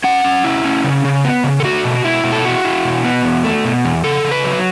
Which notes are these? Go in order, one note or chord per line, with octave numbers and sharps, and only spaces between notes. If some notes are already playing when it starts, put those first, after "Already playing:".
C#4 F#5
C#4
E4
C#4
C#3
C#3
B3
C#3
A4
A3 F#4
B2
B2 E4
B2
A4
E4 F#4
E4
B2
B3
E2
A3
B2
E2
C#3 A4
C#3
B4
F#3